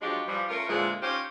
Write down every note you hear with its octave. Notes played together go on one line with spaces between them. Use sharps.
F3 F#3 G#3 D4 F4 G4
E3 F3 G3
A3 C#4 F4 A#4
A#2 D3 E3 F3 G#3
C#4 D#4 F4 G4 C5